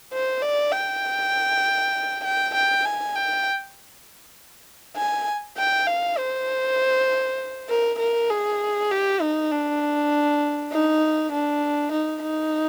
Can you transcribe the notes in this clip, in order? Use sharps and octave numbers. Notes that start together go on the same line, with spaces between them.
C5
D5
G5
G5
G5
G#5
G5
G#5
G5
F5
C5
A#4
A#4
G#4
G4
D#4
D4
D#4
D4
D#4
D#4